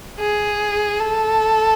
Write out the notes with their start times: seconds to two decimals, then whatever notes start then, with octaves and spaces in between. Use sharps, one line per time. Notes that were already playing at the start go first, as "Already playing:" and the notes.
0.19 G#4
1.00 A4